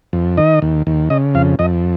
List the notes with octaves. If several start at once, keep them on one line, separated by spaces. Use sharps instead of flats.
F2
D#3 D#5
D#2
D#2
C#3 D#5
F2 F5
F2 D#5